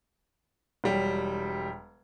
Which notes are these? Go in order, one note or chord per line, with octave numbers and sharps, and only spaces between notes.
E1 F#3 G3 G5